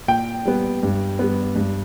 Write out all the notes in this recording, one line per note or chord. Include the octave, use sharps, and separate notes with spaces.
A#2 G5
G3 B3
G2
G3 B3
G2